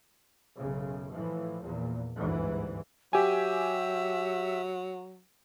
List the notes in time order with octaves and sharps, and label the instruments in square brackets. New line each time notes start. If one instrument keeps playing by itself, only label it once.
[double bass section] B1 F#2 C#3
A2 E3 F3
E2 A#2
G1 D2 G#2 E3
[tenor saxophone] F#3 [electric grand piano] G4 G#5 [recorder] E5